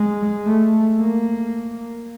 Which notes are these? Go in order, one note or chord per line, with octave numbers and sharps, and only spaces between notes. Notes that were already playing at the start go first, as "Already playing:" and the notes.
Already playing: G#3
A3
A#3